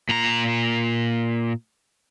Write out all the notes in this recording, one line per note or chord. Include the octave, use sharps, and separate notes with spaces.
A#2 A#5